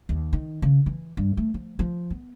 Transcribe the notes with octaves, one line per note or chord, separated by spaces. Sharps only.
D#2
D#3
C#3
E3
G2
A3
F3
F3
B3